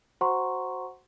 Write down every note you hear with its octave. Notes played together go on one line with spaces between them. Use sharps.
F#4 C5 F#5 A#5 C6 C#6